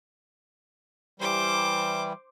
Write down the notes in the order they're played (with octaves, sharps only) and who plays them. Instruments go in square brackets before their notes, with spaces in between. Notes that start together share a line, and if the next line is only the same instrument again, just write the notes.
[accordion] E3 G3 [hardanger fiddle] C5 D6